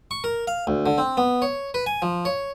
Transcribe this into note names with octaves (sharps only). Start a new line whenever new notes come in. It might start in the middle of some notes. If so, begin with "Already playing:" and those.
C#6
A#4
F5
D2
D3
C4
B3
C#5
B4
G#5
F3
C#5